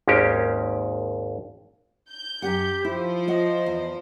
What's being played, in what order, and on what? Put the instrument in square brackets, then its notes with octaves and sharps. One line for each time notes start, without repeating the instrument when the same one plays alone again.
[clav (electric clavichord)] G#1 D#2 G#3 A#3 C#4 G4
[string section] G6
[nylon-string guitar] F#2 C#4 F#5 [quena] G4
[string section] F3 C5 [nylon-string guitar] E4
[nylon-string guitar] C#5 F#5 [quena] D#5
[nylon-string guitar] E2